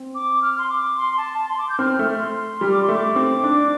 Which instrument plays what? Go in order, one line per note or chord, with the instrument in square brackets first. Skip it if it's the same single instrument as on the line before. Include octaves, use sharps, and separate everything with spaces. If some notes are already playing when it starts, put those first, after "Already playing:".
Already playing: [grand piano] C4
[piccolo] D6
F6
C6
D6
C6
A5
A5
C6
D6
G6
[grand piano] C4 [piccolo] F6
[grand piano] A3
[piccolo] C6
[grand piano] G3 [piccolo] F6
[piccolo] D6
C6
[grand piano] A3
[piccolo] D6
[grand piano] C4
D4